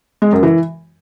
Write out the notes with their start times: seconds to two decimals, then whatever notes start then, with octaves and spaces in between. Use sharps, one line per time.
0.22 G#3
0.32 F#2
0.43 E3